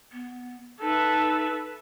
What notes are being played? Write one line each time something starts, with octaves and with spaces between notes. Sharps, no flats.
B3
D#4 A4 B4 E5